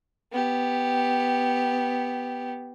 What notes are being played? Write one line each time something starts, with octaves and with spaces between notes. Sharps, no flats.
B3 G4